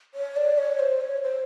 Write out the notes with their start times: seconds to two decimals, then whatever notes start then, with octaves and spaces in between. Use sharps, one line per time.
0.14 C#5
0.36 D5
0.58 C#5
0.79 C5
1.01 C#5
1.22 C5